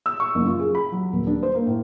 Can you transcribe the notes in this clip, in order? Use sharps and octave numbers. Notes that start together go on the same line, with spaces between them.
E6
C#6
F#1
F4
G#4
B5
F#3
D#1
D4
C5
A#3
A2